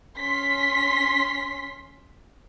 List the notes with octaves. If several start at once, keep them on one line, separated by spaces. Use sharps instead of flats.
C#4 C6 B6